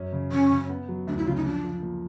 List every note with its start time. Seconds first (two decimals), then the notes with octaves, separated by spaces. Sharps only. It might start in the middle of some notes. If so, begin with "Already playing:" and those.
Already playing: F#2 C#4
0.13 C#3
0.32 C#3 C#4
0.51 C#3
0.69 B3
0.89 F#3
1.07 D2 D4
1.17 E4
1.26 C#3 F4
1.36 D#4
1.45 F3 D4
1.64 F3
1.82 A#2